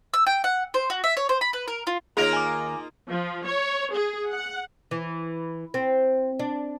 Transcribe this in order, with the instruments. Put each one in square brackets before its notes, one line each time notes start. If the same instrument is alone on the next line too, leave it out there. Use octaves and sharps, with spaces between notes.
[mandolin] E6
G5
F#5
C5
F#4
E5
C#5
C5
B5
B4
A#4
F4
[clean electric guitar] D#2 A#4 A#5 [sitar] A#3 D#4 F4 [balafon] G#4 C#5
[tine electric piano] G#5 D6
[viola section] F3
C#5
G#4
F#5
[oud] E3
C4
D4